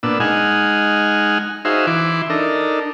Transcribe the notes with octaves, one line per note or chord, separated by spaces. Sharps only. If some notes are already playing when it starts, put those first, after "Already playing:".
A#2 B3 D4 E6
G#3 D#4 F#5 G#5 F6
D#4 F#4 G#4 C5 E5 F5
E3 E4 C6 D6
D4 D#4 A4 A#4